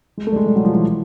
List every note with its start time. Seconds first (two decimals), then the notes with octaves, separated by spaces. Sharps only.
0.18 G#3
0.27 A3
0.32 G3
0.36 G#3
0.46 G3
0.56 F#3
0.65 F3
0.73 E3